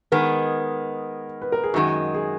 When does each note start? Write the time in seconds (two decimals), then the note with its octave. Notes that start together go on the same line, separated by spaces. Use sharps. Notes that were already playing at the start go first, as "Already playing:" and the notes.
0.12 D#3 G#3 B3 A#4
1.42 B4
1.52 A#4
1.64 G#4
1.74 F#2 D#3 G#3 F#4
2.14 G#4